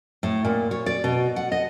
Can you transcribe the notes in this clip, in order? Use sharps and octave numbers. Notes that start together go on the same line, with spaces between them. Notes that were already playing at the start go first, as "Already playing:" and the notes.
A2
A#2
C#5
D5
B2
F#5
D#5